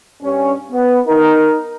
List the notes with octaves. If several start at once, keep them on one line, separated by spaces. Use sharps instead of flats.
G2 C#4
B3
D#4 A#4